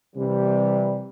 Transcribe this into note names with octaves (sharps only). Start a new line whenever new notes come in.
C3 E3 G3